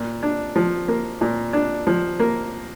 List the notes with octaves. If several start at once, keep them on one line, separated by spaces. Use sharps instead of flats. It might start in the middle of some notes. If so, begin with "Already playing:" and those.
Already playing: A#2
D4
F3
A#3
A#2
D4
F3
A#3